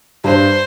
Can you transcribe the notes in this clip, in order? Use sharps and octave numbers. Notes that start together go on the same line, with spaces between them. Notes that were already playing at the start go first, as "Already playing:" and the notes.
G2 C5